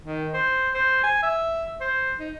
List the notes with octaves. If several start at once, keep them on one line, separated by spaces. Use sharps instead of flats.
D#3
C5
C5
G#5
E5
C5
D#4